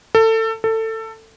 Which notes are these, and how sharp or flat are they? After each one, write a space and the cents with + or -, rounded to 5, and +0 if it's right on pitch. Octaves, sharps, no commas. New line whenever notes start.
A4 +25
A4 +20